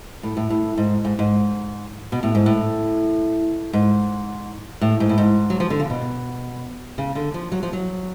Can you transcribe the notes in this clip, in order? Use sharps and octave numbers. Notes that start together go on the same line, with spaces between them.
A2
A2
A2
G#2
G#2
G#2
B2
A2
G#2
A2
G#2
A2
G#2
A2
G#2
F#3
F3
D3
C#3
B2
C#3
D3
F3
F#3
F3
F#3